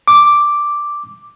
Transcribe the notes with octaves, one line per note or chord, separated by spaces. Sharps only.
D6